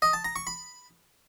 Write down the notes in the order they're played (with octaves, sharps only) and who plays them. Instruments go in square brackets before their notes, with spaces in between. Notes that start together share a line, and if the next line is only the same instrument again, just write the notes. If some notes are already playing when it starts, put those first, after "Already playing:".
[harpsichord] D#5
A5
A#5
C#6
B5